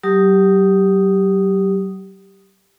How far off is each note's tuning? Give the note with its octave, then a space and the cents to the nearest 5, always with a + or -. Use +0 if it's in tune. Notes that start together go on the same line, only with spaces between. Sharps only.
F#3 +35 G4 +0 D#6 +0